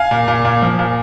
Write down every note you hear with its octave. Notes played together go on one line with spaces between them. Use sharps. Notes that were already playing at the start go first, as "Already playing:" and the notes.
Already playing: F5 G#5
A#2
A#2
A#2
F3
A#2